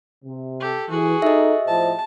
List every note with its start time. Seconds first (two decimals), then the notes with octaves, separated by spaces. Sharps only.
0.24 C3
0.60 G4 A4
0.90 E3 F#4 G#4
1.22 D#4 A4 D#5 E5
1.67 A2 F3 C5 A5